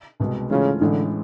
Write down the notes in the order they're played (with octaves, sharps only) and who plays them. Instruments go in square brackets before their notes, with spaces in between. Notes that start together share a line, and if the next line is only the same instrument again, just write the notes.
[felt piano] C2 B2 G#3 B3
[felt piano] G#2 E3 A3 C#4 F4 [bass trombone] C#3
[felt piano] A1 A2 E3 G#3 [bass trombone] D3